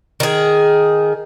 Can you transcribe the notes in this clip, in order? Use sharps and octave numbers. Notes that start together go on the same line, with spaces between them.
D#3 G#4